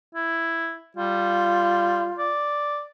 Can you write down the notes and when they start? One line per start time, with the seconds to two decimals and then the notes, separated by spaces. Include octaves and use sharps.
0.15 E4
0.97 G3 F4
2.18 D5